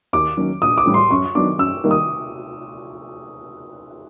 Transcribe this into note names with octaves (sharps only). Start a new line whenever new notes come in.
D#2 D6
D#3 F#3 A#3 C#4
A#1 D#6
D6
A2 E3 G3
C6
F#2 C#6
D#3 F#3 B3 D4 D6
F#2 E6
D#3 G3 A#3
D#6